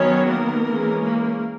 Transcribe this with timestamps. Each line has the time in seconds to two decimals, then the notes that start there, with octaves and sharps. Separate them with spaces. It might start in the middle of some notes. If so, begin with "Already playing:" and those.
Already playing: D#3 F#3 B3 C#4 C#5
0.27 A#3 A#4
0.65 E3 G#3 C#4
1.03 A#3 A#4